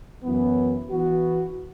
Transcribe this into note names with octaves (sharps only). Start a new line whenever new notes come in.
F#2 E3 B3
E3 B3 F#4